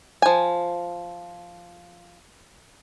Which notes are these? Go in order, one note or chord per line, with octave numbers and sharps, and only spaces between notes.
F3 G#5